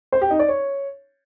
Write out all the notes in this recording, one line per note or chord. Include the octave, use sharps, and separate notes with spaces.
C5
G4
D#4
D5
C#5